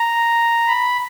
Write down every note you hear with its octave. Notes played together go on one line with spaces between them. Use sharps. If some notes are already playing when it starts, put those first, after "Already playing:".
Already playing: A#5
B5